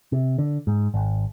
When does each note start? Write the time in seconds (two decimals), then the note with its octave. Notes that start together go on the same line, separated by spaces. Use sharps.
0.12 C3
0.38 D3
0.67 G#2
0.94 G#1